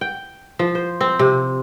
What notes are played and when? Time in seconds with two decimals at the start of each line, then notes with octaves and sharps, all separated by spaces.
0.01 G5
0.59 F3
0.75 C5
1.01 C4
1.19 C3